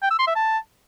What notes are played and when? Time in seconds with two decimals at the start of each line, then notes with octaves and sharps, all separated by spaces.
0.02 G5
0.11 E6
0.19 C6
0.27 E5
0.35 A5